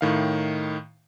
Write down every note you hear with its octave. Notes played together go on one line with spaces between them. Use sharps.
A2 D#3 F5